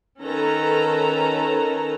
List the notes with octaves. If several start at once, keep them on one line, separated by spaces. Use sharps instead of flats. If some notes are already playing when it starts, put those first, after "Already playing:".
D#3 C#4 A4 B4 A#5